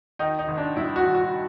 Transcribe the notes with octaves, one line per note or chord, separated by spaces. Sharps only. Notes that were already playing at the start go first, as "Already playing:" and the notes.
D#3 D#4
D#4
G#1
D4
G2 E4
F#4
G#1
F#4